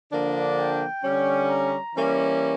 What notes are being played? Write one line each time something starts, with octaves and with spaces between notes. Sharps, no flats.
D3 F3 A#3 D4
G5
D3 G3 C#4
A#5
E3 G3 A#3 C#4